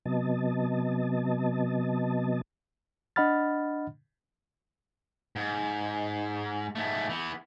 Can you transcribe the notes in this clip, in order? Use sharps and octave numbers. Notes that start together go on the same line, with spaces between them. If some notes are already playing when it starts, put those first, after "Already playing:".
C3 F#3 B3 D#5 A5
D4 D#5 F#5 B5 F6 A6
G#2
G#2 A3
E3 B3